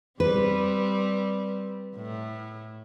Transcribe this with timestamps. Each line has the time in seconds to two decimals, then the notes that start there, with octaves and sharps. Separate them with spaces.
0.20 G3 C4 B4
1.96 A2